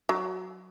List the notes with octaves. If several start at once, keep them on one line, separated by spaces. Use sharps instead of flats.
F#3